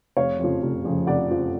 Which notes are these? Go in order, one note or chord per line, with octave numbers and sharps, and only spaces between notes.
F1 C#5 F5
F2 C#3 F3
F1
F2 C#3 F3
F1 D5 F#5
F2 C#3 F3